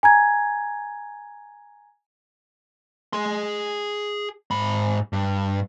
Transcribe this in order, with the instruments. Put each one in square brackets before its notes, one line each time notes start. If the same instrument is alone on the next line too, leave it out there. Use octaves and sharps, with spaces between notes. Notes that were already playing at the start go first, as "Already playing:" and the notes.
[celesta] G#5 A#5 G#6
[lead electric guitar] G#4 C6
G#2 B5
G2